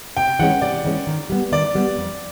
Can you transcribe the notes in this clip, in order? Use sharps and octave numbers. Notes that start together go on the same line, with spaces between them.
C3 G5
E3 G#3 C#4 F#5
C3 D5
E3 G#3 C#4
D#3
G3 B3
D#3 D5
G3 B3
F2